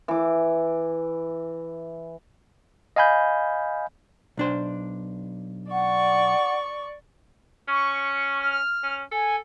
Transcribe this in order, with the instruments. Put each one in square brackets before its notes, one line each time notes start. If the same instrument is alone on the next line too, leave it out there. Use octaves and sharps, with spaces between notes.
[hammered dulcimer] E3 D6
[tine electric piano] D#5 F5 G#5 B5 G6
[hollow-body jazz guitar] B1 D4 C5
[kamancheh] D5 C#6 [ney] F#5
[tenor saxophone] C#4 [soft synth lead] C#6
[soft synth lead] F6
[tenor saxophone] C#4
[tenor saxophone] A4 [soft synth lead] G#5